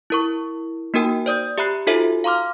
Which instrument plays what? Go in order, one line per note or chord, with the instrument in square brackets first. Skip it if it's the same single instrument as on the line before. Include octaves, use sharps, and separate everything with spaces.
[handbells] E4 A#4 C#6
A#3 D#4 F#4 A#4 G5
C5 D5 D#6 G6
G4 E5 A#5 B5 F#6 C7
D#4 F4 F#4 A4 C5 E5
F5 A#5 C6 D6 F6